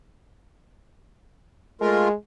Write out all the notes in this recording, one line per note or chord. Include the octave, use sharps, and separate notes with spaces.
G#3 A3 F4 A#4